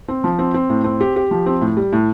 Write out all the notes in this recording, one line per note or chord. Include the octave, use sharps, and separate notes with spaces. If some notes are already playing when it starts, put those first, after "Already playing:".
C4
F3
C4
C4
A2
C4
G4
G4
F3
C4
A2
G3
A2